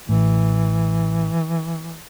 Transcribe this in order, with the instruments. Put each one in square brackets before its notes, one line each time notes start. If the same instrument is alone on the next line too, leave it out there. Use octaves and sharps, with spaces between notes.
[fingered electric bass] A1 A2 [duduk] E3